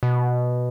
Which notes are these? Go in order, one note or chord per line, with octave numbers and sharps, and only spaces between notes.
B2